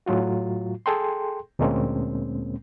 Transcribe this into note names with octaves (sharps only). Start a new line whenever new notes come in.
A2 F#3 F4 F#4
G#4 A4 G5 C6
D2 A#2 G#3 A#3 C4 C#4